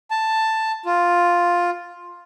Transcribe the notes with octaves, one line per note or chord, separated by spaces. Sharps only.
A5
F4